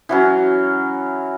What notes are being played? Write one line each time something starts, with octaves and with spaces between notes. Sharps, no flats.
E3 F#3 C#4